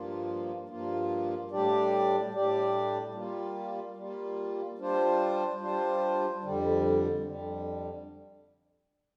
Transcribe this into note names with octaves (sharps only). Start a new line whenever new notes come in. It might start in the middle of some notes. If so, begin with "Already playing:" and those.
Already playing: G2 F3 A#3 F4
G2 F3 A#3 F4
A2 G3 D4 G4 D5
A2 G3 D4 G4 D5
G3 A#3 F4
G3 A#3 F4
G3 D4 F4 C5
G3 D4 F4 C5
F2 D3 G3
F2 D3 G3